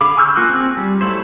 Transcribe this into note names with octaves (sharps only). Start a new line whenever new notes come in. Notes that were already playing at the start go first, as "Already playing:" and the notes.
D3 G#4 F5 B5 D6
G#5 C#6 E6 F6 G6
A#3 F4 F#4 F#6
C4 G#4
G3
F#3 A3 E4 C5